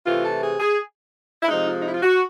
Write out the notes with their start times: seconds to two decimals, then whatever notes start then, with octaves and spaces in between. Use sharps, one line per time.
0.05 C3 E3 A3 F4
0.24 A4
0.42 G#4
0.60 G#4
1.43 E4
1.48 C3 F3 G#3 D#4
1.67 F4
1.79 D#4
1.87 E4
1.94 F4
2.03 F#4